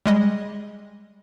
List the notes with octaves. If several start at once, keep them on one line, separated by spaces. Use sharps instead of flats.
G3 G#3 D#5